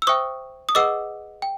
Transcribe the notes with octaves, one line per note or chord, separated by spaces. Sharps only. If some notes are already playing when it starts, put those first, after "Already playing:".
E6
C5 E5 G5 C#6 D#6
D#6
G#4 B4 D#5 F#5 D6 E6
G5